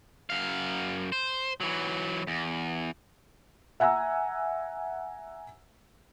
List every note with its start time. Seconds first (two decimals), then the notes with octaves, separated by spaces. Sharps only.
0.30 F#2 F5
1.12 C5
1.61 E3 F#3
2.27 E2
3.80 E5 F#5 G#5 A#5 E6